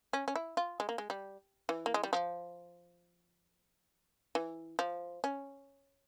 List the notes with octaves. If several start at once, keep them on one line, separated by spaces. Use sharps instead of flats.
C#4
C#4
E4
F4
G#3
A#3
G#3
G3
E3
A#3
G#3
G3
F3
E3
F3
C#4